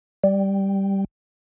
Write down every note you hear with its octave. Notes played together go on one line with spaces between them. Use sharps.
G3